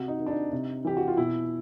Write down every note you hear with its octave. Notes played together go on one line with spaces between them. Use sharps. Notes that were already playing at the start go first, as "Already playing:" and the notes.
Already playing: C3 F#4
D#4
D#3
D4
D#4
C3
E3 G4
F#4
F4
B2 E4